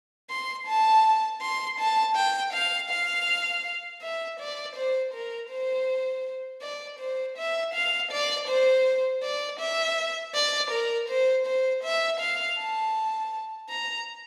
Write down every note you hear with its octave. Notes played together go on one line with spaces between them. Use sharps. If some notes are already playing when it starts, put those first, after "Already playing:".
C6
A5
C6
A5
G5
F5
F5
E5
D5
C5
A#4
C5
D5
C5
E5
F5
D5
C5
D5
E5
D5
A#4
C5
C5
E5
F5
A5
A#5